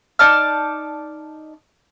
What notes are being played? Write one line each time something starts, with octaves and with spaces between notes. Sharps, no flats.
D#4 D5 A5 F6